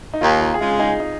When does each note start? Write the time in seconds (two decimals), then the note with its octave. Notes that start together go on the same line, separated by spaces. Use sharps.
0.14 D#4
0.21 D#2 F4
0.41 F4
0.54 G#4
0.60 C#3 G#3 F4
0.79 D#4 G#4
1.00 D#4